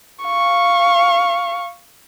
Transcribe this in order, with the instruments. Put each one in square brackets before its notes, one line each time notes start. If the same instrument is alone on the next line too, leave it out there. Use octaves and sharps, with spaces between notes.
[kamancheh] F5 C#6